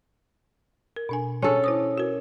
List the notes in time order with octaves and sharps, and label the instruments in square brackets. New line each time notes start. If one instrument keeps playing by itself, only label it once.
[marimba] A#4
B2 D4 G#5
[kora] C#4 A4 [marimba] D4 G#4
[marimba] E4 C5 D#6
F#4 A#4